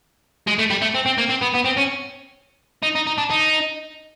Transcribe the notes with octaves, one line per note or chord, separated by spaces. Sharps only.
G#3
A3
G3
A3
C4
C4
A#3
C4
B3
B3
C4
C#4
D#4
D#4
D#4
D4
D#4